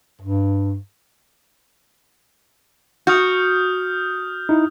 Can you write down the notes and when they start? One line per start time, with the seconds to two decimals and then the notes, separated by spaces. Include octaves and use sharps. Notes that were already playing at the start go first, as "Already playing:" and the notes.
0.21 G2
3.07 F#4 D#6 F6 G6
4.49 D#4 E4